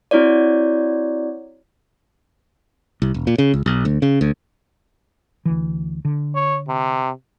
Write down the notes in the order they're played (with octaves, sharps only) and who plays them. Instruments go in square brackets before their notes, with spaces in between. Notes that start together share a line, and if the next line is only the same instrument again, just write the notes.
[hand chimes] C4 E4 F#4 C#5 D5
[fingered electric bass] C2
E1
A#2
C#3
C#2
B1
D2
C#3
D2
[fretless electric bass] D2 E3
D3
[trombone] C#5
C3